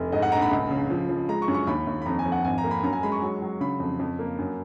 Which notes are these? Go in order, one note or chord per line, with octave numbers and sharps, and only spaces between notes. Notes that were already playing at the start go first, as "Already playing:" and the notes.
Already playing: F1
G#2 D#5
F#5
A#1 A#5
B5
C#2
C#3
F3
F3
G#3 A#5
C#6
F#2
C#6
D#2 B5
D#2
B5
F2 A#5
G#5
F2
F#5
G#1 G#5
A#5
A#3
B5
F#2 A#5
G#5
G#3 B5
C#6
F#3
F#3
C#3 B5
F2
F2
A#3
F#2